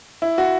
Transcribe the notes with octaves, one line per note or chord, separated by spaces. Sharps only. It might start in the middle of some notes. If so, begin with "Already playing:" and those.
E4
F#4